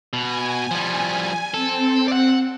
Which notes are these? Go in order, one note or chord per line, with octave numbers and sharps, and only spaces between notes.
B2 G#5
F3 G3
C4 A4
D5 F#5